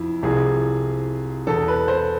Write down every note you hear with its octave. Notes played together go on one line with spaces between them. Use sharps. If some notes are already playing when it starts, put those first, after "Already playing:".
Already playing: F2 E4
C2 C3 F3 G#4
E2 B2 A4
B4
C5